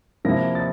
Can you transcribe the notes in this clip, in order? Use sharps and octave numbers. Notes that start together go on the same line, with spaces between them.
C3 F3 A#3 E4 A#6
A6